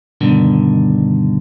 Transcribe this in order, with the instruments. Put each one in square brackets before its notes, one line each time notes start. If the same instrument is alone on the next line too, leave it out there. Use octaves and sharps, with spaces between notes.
[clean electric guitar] G2 B2 D3 D#3